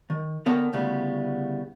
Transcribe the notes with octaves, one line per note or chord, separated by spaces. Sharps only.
D#3
D3 B3 A#4 C#5 G5 A5
D2 A2 C#3 G3 B3